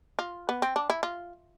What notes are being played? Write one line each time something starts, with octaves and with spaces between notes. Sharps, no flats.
F4
B3
C4
D4
E4
F4